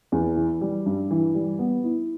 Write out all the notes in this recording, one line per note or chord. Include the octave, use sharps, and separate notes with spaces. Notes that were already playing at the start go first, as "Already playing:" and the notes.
E2
E3
G3
G2
E3
G3
B3
E4